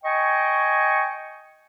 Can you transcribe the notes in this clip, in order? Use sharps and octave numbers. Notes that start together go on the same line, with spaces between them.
D#5 G5 G#5 C#6